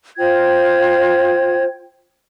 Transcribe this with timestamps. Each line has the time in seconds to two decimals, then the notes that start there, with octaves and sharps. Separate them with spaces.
0.17 F4 C5 G5 G#6